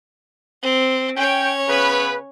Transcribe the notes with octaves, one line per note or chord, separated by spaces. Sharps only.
C4
C#4 C#5 G5
C#3 B3 B4